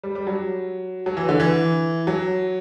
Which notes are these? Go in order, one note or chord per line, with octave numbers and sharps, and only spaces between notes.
G3
G3
F#3
F#3
E3
D3
E3
F#3